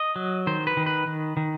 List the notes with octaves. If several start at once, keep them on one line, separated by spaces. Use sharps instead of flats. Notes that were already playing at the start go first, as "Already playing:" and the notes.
Already playing: D#5
F#3
D#3 C5
B4
D#3
B4
D#3
D#3